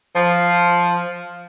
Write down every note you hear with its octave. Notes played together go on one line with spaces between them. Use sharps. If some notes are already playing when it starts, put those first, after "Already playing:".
F3